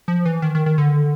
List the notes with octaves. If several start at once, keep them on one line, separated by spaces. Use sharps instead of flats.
F3
E3
D#3
D#3
D#3
D3